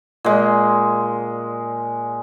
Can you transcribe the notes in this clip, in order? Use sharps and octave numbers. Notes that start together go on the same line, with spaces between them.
A#2 G#3